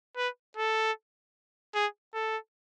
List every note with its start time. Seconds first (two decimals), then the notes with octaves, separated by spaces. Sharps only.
0.17 B4
0.57 A4
1.75 G#4
2.14 A4